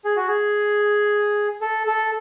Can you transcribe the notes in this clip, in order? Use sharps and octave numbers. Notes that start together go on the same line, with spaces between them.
G#4
F#4
G#4
A4
A4